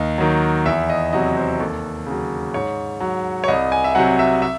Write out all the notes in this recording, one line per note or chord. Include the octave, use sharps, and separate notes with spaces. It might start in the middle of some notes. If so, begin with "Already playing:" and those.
Already playing: D#2 D#5
D#3 F#3
E2 E5
D#5
C3 F#3 D#5
C5
D#2 A4
C#3 F#3
G#2 C#5
F#3
C#5
C2 D#5
G#5
E5
C3 F#3 F#5
E5
E5